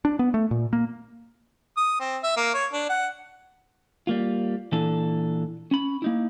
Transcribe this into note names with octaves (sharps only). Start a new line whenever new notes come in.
D4
B3
A3
A#2
A#3
D#6
C4
E5
A#3
C#5
D4
F#5
G3 A#3 F4
A#2 E3 D4 A4
C#4 B5
A#3 D#4 E4